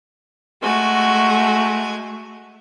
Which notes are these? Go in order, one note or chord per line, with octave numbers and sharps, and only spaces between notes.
G#3 A3 F#4 G#5